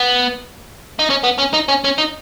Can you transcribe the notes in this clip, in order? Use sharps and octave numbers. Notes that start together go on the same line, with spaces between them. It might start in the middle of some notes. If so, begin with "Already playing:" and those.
Already playing: B3
D#4
C#4
B3
C#4
D#4
C#4
C#4
D#4